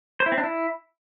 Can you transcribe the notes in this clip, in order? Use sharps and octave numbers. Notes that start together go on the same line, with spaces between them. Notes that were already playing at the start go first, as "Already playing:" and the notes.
C5
E4
C4
D4
E4